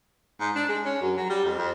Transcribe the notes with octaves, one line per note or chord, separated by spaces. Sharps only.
G#2
D4
G#3
C#4
F#2
F#3
G3
F2
F2